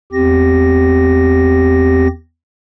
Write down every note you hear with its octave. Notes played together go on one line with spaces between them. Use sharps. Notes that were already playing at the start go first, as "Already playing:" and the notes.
E2 C4 G4 A#6